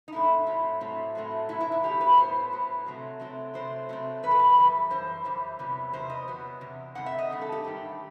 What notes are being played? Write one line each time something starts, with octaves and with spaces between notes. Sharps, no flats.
D#4
A2 F#3 A3 C4 E4
A2 F#3 A3 C4
A2 F#3 A3 C4
A2 F#3 A3 C4
A2 F#3 B3 E4
E4
E4
A2 F#3 B3 G4
B4
A2 F#3 B3 C5
A2 F#3 B3
C3 F#3 A3 C4
C3 F#3 A3 C4
C3 F#3 A3 C4 C5
C3 F#3 A3 C4
F#2 E3 B4
A4
B4
F#2 E3 G3
F#2 E3 C5
F#2 E3 G3
E2 C3 F#3 B3
E2 C3 F#3 B3 C5
D#5
E2 C3 F#3 B3
E2 C3
G2 D#3 A3 C4 F#5
E5
D#5
G2 D#3 A3 C4
A4
G4
G2 D#3 A3 C4